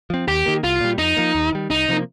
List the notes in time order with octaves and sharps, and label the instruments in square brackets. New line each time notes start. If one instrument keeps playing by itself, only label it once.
[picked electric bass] F3 C4
[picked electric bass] D#2 [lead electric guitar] G4
[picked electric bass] D#3 A#3
[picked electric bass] C2 [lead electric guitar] F4
[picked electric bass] A#2 G3
[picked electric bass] F2 [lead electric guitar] D#4
[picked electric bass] F3 A#3
D#2
D#3 G3
[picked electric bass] C2 [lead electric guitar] D#4
[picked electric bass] C3 F3 A#3